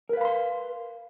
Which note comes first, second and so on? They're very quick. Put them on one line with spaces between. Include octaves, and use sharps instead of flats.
A#4 B4 F5 B5 C6